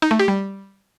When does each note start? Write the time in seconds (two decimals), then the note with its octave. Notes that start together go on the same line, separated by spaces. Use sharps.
0.02 D#4
0.11 A3
0.19 G4
0.28 G3